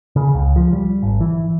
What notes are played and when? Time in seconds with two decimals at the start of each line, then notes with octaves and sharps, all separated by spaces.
0.16 C#3
0.35 C#2
0.56 F3
0.73 G3
1.03 G#1
1.21 E3